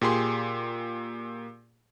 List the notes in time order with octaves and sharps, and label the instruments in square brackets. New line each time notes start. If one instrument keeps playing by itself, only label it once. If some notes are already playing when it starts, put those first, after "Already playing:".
[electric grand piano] A#2 G4 G#4 C6